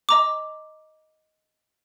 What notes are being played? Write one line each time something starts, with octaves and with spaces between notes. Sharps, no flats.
D#5 A#5 D6